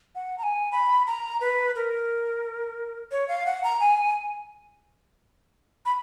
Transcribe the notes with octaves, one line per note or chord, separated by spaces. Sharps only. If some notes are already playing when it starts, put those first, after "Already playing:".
F#5
A#5
G#5
B5
A#5
B4
A#4
C#5
F5
F#5
A#5
G#5
B5